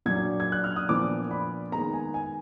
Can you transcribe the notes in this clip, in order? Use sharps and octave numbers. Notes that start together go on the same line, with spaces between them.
A#2 F#3 D4 G#6
G#6
F#6
F6
D#6
A#2 F3 B3 D4 D6
B5
D#3 G#3 B3 A#5
G#5
G#5